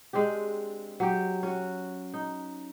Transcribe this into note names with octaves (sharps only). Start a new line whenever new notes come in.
G#3 C4 D4 G4
F#3 G4
C#4 F#4
D#4